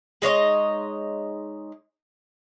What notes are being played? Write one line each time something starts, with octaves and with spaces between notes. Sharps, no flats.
G#3 D#4 C#5 D#5